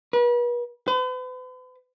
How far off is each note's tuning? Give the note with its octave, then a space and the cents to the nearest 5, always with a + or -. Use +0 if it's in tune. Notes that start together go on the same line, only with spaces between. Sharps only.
B4 -40
B4 +45